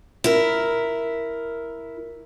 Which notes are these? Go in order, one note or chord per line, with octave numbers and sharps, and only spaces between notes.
E4 A#4